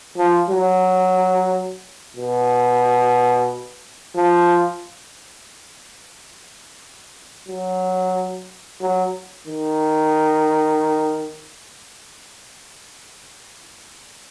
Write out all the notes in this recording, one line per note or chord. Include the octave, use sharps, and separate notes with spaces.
F3
F#3
B2
F3
F#3
F#3
D#3